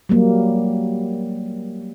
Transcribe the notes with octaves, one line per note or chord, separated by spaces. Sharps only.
F#3 G3 A#3